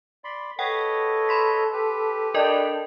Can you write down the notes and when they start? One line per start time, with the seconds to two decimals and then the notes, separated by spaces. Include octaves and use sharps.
0.24 D5 B5 C6
0.59 A4 B4 C#5 D#5 F#5 G5
1.29 B5 C6 B6
1.73 G4 B4
2.34 D4 A#4 D5 D#5 G5